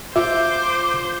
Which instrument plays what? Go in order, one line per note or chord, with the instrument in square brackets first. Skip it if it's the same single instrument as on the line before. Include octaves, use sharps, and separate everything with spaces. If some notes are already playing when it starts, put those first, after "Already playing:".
[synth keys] F4 [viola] C5 [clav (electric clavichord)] E5 [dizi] D6